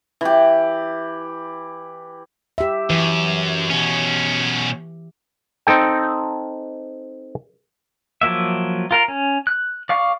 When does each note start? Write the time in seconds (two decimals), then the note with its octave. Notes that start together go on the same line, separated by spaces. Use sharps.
0.21 E3 G4
2.58 G4 E5
2.90 F#2 E3
3.70 B2 C#4
5.67 C4 D#4 A4 G5
8.21 F3 F#3 A#3 E5
8.91 F4 A#4 F5
9.08 C#4
9.47 F#6
9.89 D5 F5 C#6